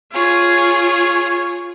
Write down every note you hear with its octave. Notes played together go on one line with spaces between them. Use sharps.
F4 G#4 C#5